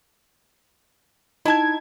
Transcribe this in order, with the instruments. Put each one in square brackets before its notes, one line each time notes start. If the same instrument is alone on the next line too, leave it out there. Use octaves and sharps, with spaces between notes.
[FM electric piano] D#4 G#6 [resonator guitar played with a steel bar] E4 A5